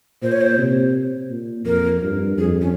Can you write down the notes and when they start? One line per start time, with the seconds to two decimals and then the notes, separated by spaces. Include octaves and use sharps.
0.23 A#2 C5
0.32 C#5
0.41 C5
0.58 C3
1.30 A#2
1.65 F2 A#4
2.02 G2
2.37 F2 G#4
2.61 C#4